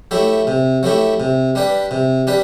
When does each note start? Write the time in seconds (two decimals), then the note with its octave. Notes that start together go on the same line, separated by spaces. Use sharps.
0.11 F#3 A3 E4 G4
0.47 C3
0.83 F#3 A3 E4 G4
1.20 C3
1.55 G3 D4 G4 B4
1.91 C3
2.27 G3 D4 G4 B4